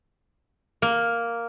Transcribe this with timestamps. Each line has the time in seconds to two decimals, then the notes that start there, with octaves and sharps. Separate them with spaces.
0.82 A#3